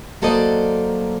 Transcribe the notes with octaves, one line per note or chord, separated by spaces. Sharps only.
F#3 A#3 A4 C5 D5 D#5